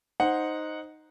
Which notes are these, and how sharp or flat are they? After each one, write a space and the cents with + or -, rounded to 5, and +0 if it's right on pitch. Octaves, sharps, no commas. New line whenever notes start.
D#4 +0 C5 +0 F#5 -10